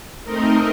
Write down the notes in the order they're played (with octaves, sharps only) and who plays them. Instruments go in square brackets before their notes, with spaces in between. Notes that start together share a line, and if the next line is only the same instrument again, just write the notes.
[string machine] A3 C4 D#4 A#4 D#5